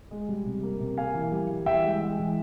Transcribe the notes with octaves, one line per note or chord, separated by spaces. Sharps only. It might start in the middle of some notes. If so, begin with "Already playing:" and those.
G#3
G3
C3
A#3
C3
A#3 F5 G#5
E3
G3
G3
E3 E5 G5
G#3
G#3
E3